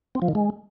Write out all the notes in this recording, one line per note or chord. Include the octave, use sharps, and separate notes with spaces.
C4
F3
D#3
G#3